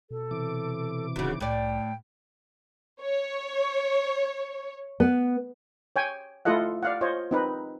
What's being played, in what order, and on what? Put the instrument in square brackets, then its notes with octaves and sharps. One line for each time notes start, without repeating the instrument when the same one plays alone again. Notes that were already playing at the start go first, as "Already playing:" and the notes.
[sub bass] B2 [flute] A4
[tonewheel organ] C3 E3 D6
[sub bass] D1 [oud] D#2 C#3 [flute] F#4
[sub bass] C2 [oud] A2 D5 [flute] G5
[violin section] C#5
[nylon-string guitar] B3
[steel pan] C#5 G5 G#5
A3 E4 F4 A4 D#5 F#5
D5 F5 F#5
F4 C5 C#5 D#5
C4 D#4 B4